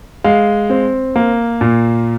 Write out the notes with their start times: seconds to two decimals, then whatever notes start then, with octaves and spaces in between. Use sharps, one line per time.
0.24 G#3 F5
0.70 C4
1.16 A#3
1.61 A#2